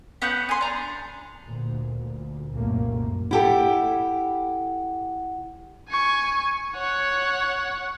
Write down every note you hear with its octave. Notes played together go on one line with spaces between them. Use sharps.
B3 C#4 F#5 G6
G#5 C6
D4 A#5
D2 A#2
C2 F#2 A#2 A3 A#3
E4 G4 A4 F#5
G#5 C#6
C#5 F#5